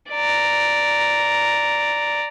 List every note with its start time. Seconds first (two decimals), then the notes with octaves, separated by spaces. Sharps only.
0.11 D5 A#5